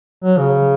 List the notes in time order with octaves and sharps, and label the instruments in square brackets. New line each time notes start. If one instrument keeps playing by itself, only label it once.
[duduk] F#3
C#3